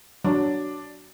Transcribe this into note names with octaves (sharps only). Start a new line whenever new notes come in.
F#3 D4